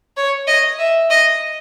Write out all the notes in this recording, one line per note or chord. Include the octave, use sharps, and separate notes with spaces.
C#5
D#5
E5
D#5